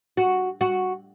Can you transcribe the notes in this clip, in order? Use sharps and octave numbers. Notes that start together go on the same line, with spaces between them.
F#4
F#4